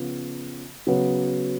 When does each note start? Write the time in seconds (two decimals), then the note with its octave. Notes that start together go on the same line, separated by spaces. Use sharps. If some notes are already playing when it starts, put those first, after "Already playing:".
Already playing: C#3 F3 B3 F4
0.87 C#3 F#3 B3